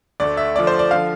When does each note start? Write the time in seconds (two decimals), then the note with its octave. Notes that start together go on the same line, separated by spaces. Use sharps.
0.20 D2 D3 A3 D5
0.37 E5
0.55 D3 F3 A3 D4 D5
0.67 C5
0.79 D5
0.91 D3 F3 F5